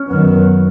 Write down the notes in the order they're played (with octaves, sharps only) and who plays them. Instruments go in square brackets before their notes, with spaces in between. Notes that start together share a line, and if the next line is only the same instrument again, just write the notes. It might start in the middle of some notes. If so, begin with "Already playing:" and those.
Already playing: [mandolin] C#4
[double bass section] F#2 D#3 F#3 B3